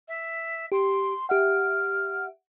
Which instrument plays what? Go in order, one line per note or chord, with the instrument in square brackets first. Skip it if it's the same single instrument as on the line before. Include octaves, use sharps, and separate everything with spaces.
[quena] E5
[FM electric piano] G4 [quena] C6
[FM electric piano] G4 E5 F#5 [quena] F6